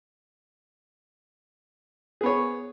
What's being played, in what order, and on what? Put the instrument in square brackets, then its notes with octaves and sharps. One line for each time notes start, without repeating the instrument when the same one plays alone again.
[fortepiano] G#4
B3
C#5